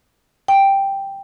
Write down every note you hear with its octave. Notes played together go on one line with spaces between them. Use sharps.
G5